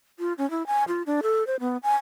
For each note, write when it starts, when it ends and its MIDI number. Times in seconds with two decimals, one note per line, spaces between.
0.19 0.33 65
0.38 0.49 61
0.50 0.66 64
0.67 0.84 80
0.88 1.03 65
1.06 1.20 62
1.23 1.46 69
1.47 1.56 72
1.60 1.77 59
1.83 1.95 80